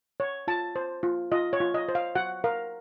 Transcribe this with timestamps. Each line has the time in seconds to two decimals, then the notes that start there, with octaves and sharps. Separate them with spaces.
0.20 C#5
0.48 F4 A5
0.76 C5
1.03 F4
1.32 F4 D#5
1.53 C#5
1.60 F4
1.74 D#5
1.89 C5
1.95 F5
2.15 F#4 F#5
2.44 A#4 F5